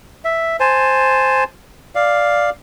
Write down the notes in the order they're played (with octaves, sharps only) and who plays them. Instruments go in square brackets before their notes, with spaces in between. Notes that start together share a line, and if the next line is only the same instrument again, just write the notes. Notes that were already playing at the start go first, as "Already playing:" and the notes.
[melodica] E5
C5 G#5 A5
D5 F5